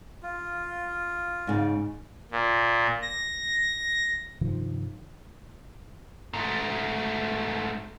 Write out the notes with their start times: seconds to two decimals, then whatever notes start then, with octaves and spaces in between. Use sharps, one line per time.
0.23 F4
1.47 G#2 C#3
2.31 A#2
3.02 A#6
4.41 G2 C3 D#3 F3
6.33 G#2 A3